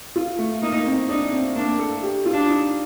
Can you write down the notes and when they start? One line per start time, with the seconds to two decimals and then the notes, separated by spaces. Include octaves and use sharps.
0.16 F4
0.39 A3
0.62 A#3 D#4
0.86 C4
1.09 D4 D#4
1.32 C4
1.56 A#3 D4
1.79 A4
2.03 G4
2.26 F4
2.33 D4
2.49 D#4